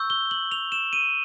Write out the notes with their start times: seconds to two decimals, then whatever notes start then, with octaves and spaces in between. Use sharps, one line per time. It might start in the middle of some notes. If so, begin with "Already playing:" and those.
Already playing: C#6 E6 G6
0.10 G7
0.31 F#7
0.51 F7
0.72 E7
0.93 D#7